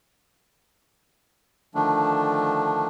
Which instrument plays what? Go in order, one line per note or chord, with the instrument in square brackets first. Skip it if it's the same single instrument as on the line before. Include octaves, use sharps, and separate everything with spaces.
[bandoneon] D3 D#3 F3 A3 D4